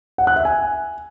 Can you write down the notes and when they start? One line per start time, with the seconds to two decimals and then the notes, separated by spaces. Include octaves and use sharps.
0.18 F#5
0.27 F#6
0.36 E5
0.45 G#5